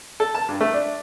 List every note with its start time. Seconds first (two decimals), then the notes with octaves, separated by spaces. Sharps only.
0.20 A4
0.35 A5
0.49 G2
0.61 A3
0.74 D4